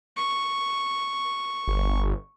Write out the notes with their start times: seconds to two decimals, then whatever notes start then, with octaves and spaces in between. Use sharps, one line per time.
0.17 C#6
1.68 G1